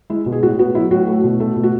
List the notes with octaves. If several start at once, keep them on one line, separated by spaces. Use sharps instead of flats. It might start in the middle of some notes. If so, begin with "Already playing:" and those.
G#3 E4
B2
G#4
A2 F#4
B3 F#4
F#3 E4
A2 F#4
A3
B2
A3
B2
F#4